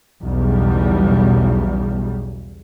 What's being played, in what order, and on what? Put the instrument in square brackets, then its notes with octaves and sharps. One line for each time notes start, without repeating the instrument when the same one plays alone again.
[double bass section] B1 E2 C#3 G3